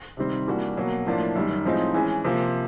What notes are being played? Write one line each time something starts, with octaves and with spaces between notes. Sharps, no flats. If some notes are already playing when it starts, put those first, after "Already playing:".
C3 D#3 G3 C4
E3 G3 A#3 D4 F#4
B2 F#3 A#3
A2 F3 A#3 D4 F4
F#2 D#3 G3
A2 F3 G#3 C4 D#4
E3 G#3 C#4
C3 F3 A#3